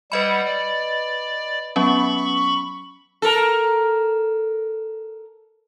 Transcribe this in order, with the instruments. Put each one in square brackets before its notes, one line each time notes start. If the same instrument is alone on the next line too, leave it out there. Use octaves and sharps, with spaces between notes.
[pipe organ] G3 F#5 [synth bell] B4 D#5 B5
[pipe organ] D5
[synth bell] F#3 B3 C#4 [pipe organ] B5 C#6
[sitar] A4 A#4